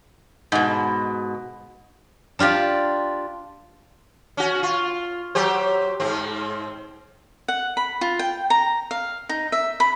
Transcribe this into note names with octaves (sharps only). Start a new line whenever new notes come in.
G#2 B2
D4 F4 G4 D5
C#4 F#4
F4
F#3 G4 C5
G#2 C4
F#5
B5
F4
G5
A#5
F5
D#4
E5
B5